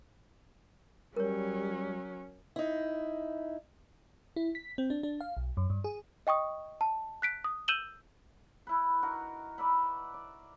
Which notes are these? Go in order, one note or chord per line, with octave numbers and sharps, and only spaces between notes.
F#3 G3 C#4 A#4 C#5
D#4 E4
E4
B6
C4
D4
D4
F5
B1
F#2
G2
G#4
D#5 G5 C#6 D#6
A5
F#6 B6 D7
D#6
E6 G6 D#7 E7 F#7 G7
E4 B4
D#4 F#4 A#4
B4 D5 E5 B5
D5